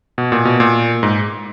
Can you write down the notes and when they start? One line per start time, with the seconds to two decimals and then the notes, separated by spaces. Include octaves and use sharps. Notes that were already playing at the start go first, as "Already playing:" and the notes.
0.18 B2
0.32 A#2
0.45 B2
0.60 A#2
1.03 G#2